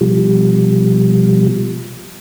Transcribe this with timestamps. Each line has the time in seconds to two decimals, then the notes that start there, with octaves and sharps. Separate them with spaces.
0.01 B2 F3 G3